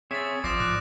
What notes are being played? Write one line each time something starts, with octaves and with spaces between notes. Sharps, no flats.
C4 G#4 C#5 E5 D#6 A6
A1 F3 C5 D5 D6 D#6 A#6 E7
G#2 F#6